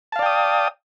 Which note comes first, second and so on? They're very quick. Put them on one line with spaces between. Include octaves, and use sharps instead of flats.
A5 F5 D5 G5 D#6